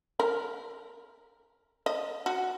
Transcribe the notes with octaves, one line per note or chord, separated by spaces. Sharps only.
A#4
D#5
F#4